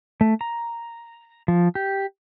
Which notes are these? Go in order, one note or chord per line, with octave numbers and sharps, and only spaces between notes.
A3
A#5
F3
G4